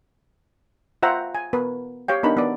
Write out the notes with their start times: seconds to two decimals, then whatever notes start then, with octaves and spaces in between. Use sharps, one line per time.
1.02 F4 C5 E5 F#5 G5 A#5
1.35 G#5
1.53 B3 A#4 B4
2.08 G4 C#5 F5 G5
2.23 B3 D4 D#4 A#4 B5
2.37 B3 D5